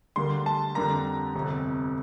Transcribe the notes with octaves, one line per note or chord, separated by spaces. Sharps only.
D2 D3 G3 A#3 C6
A5
F2 D3 G3 A#3 A#5
G1 F2 C3